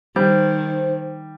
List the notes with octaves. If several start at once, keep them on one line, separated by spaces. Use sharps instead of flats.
D#3 G3 C5